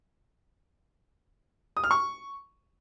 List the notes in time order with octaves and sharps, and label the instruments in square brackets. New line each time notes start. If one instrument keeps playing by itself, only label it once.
[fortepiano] D#6
F6
C#6